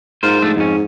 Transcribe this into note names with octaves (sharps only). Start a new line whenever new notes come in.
G#2 F4 A#4 C5
F3 A3 D4
F2 G#2 C#4